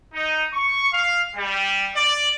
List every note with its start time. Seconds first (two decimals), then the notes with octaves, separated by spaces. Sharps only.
0.14 D#4
0.53 C#6
0.93 F5
1.36 G3
1.95 D5